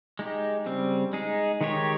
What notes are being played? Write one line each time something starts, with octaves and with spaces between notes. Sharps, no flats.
G#3 D#4 G4
C#3 G3 C4
G#3 D#4 G#4
D#3 G#3 D#4 G4 C#5